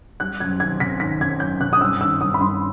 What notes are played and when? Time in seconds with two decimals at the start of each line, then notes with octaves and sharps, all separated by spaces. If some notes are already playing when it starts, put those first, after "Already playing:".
0.20 G3 F#6
0.40 F#2 G#6
0.60 D#3 G#6
0.80 G#1 B6
1.00 D#3 B6
1.21 G#1 G#6
1.40 F#2 G6
1.61 G#1 F#6
1.73 D#6
1.81 G2 E6
2.00 D#3 E6
2.21 G2 D#6
2.34 B5
2.41 G2 C6